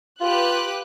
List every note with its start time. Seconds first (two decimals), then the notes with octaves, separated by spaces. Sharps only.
0.20 F4 G4 B4 F#6